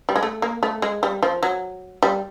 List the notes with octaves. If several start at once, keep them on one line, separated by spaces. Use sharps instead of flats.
G3
G#3
A3
A#3
A3
G#3
G3
F3
F#3
G3